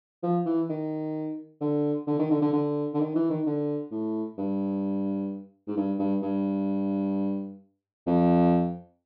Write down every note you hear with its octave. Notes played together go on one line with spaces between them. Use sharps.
F3
E3
D#3
D3
D3
D#3
D3
D3
D3
D3
D#3
E3
D#3
D3
A2
G2
G#2
G2
G2
G2
F2